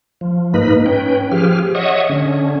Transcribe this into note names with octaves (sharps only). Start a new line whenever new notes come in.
F3
G#2 A#3 D#4 B4 B5
C#4 B4 G5
F3 G4 G#4 F6
C#5 D#5 E5 F#5 C#6 D#6
D3 C#4